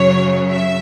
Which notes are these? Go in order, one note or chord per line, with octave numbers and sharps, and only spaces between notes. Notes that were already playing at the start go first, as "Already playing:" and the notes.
Already playing: F#2 C#3 F#3 C#5
E5